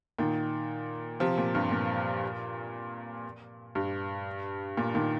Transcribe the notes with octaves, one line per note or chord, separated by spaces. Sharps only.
A#2 D#3
C3 F3
A#2
G2 C3
A#2
G2
A#2
A#2 D#3